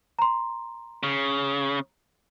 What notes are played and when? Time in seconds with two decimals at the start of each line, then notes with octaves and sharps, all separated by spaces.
0.19 A#5 C6
1.03 C#3